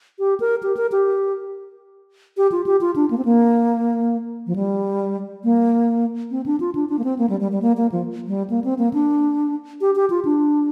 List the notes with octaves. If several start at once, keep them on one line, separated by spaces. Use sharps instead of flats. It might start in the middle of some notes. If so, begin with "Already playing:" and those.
G4
A#4
G4
A#4
G4
G4
F4
G4
F4
D4
A#3
C4
A#3
F3
G3
A#3
C4
D4
F4
D4
D4
A#3
C4
A#3
G3
G3
G3
A#3
A#3
F3
G3
A#3
C4
A#3
D4
G4
G4
F4
D4